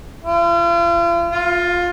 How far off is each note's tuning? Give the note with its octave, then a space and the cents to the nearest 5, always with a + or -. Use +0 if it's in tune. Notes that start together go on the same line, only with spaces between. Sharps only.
F4 -40
F4 +15